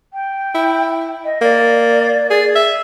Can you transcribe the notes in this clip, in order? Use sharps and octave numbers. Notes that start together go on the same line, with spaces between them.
G5
E4
D#5
A#3 D5
G#4
E5